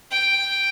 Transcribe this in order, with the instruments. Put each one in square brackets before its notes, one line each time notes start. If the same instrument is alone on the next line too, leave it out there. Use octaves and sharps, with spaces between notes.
[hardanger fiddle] G5